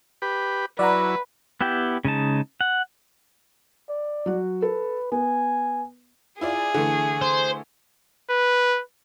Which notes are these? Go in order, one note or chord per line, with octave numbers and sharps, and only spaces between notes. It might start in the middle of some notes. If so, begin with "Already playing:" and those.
G4 B4
F#3 E4 B4 D5 F#5 A#5
B3 E4 G4 G5
C#3 G#3 D#4 A5
F#5
D5
F#3 F#4
A4 B4
B3 G#5
E4 F4 G#4 D5
D3 E3 A3
C5
B4